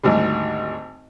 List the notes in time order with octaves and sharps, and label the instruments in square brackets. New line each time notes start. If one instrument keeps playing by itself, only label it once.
[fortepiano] G#1 D2 G#2 G3